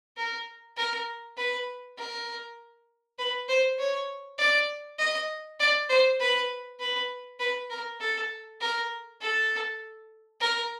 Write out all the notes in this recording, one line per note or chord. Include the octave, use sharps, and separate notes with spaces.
A#4
A#4
B4
A#4
B4
C5
C#5
D5
D#5
D5
C5
B4
B4
B4
A#4
A4
A#4
A4
A#4